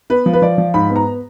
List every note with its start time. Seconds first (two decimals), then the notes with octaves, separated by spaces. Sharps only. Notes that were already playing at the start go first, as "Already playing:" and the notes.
0.10 B3 B4
0.26 F3
0.33 B4
0.42 F3 D5
0.58 F3
0.74 G#2 B5
0.90 B3
0.96 A#5